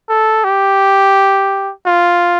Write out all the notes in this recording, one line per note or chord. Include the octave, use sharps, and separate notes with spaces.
A4
G4
F4